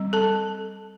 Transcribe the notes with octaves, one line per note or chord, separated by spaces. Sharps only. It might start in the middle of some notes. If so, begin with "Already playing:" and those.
Already playing: G3 C4
A4 A5